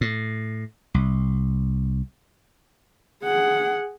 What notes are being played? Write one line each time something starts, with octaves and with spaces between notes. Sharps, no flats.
A2
C2
G#4 F#5